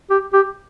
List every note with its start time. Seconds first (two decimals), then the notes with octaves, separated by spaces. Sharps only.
0.10 G4
0.33 G4